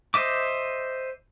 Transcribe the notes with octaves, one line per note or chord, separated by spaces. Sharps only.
C5 D#5 E5 D6